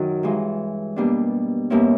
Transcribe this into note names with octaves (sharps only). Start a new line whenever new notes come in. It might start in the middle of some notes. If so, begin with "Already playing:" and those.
Already playing: F#2 D#3 F#3
G2 E3 G#3
B2 G3 A#3 D4
B2 G3 A#3 C#4 E4